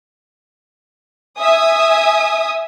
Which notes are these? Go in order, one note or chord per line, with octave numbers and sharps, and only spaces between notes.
E5 G#5 D#6